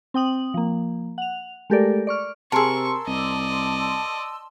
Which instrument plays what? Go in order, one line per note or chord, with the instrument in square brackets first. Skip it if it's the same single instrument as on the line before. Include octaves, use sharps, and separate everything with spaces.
[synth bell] C4 G5 D#6 F#7
F3 A#3
F#5 F7
G#3 A3 G4 A4 A#4 D5
D5 C#6 F6
[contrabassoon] C3 [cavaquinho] G#4 A#4 [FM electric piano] A5 C6 E6 [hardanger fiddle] C#6
[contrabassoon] C2 [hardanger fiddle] D5 D#5